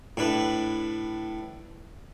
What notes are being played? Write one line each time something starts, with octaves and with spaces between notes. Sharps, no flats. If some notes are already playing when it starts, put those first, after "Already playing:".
A2 D4 B4